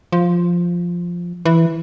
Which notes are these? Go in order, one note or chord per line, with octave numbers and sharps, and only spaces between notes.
F3
E3